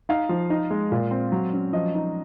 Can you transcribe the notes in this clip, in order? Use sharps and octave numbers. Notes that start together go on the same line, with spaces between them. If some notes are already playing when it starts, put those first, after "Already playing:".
D#4 F5
F3
D#4
G#3
A#2
C4
F#3
C#4
F3 D#5
D#4